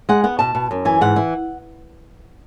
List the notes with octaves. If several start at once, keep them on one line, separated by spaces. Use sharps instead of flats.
G#3 F#5
B3 F#5
B2 A5
B2
F#2
E3 G#5
G#2 F#5
E3